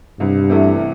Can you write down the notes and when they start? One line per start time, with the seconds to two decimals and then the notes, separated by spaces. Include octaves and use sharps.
0.20 C2 G2
0.49 C3 E3 A3 E4